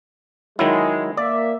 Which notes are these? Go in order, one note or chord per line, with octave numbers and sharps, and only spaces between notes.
D#3 F#3 G#3 E4
A#3 D5 E5